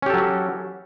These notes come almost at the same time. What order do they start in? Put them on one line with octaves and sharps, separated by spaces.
C#4 G4 A4 F#3